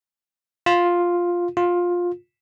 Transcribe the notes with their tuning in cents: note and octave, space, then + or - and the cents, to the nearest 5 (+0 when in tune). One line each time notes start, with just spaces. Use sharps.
F4 +5
F4 +15